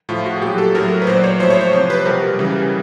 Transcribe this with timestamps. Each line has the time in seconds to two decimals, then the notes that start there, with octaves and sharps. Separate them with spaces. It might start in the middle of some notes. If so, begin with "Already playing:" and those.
0.09 A2 F3 F4
0.26 F#4
0.37 G#4
0.41 A#2 F#3 G4
0.58 A4
0.75 A2 F#3 A#4
1.02 B4
1.07 A#2 F#3 C5
1.16 D5
1.24 C#5
1.40 A2 F3 C5
1.50 C#5
1.61 C5
1.73 C3 F3 C5
1.90 B4
2.05 B2 G3 A#4
2.39 C#3 E3 G3